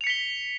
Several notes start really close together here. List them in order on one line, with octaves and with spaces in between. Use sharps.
F7 C#7 B6 G7